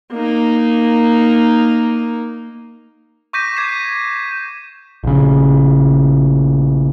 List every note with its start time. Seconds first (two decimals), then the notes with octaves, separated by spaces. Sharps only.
0.11 A#3 D#4
3.33 C#6 D6 G6 A#6 B6 D#7
3.56 D6 G#6 B6 C7 E7
5.04 A#1 C#3